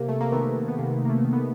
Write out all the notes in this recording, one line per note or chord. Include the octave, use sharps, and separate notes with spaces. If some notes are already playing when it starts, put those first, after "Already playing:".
Already playing: C3 A#3
A3
A#3
D#3 A3 B3
B3
C3 A#3
A#3
A3
D#3
B3